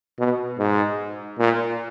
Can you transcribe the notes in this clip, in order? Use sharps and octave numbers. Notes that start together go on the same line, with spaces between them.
B2
G#2
A#2